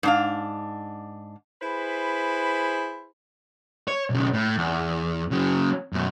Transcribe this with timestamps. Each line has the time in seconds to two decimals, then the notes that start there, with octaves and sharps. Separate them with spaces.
0.03 G#2 D4 F5
1.62 E4 G#4 B4 C5 B5
3.88 C#5
4.10 B1 C#3
4.33 A2
4.57 E2
5.31 C#3 F#3
5.93 F#2 B2